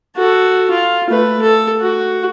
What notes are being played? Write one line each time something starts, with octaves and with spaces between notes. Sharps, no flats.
F#4 A4
F4
A3 B4
A4
F#4